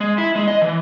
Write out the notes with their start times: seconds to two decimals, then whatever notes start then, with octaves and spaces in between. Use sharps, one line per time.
0.01 G#3
0.18 E4
0.36 G#3
0.48 D#5
0.62 E3